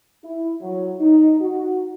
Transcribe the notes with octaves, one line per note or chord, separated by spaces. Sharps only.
E4
F#3
D#4
F#4